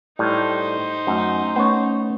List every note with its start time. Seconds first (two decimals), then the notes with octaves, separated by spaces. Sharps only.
0.19 A2 G3 D#4 C5
1.07 F#2 A3
1.56 A3 B3 C#4 C#5